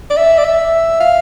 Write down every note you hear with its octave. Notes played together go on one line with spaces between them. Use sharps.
D5
E5
D5
E5
F5